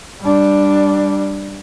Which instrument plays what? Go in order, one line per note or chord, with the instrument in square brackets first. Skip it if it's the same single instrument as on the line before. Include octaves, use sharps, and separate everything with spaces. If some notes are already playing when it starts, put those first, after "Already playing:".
[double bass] G3 D4